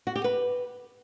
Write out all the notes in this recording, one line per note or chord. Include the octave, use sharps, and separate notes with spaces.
F#4
G4
B4